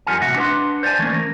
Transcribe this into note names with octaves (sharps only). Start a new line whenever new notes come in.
F2 G3 F4 A#4 F#5 G#5
A2 C3 F#4 E5 F#5
D4 B4 F#5 C6
C5 D5 D#5 G#5 A5
E3 A3 A#3 C#4
A#4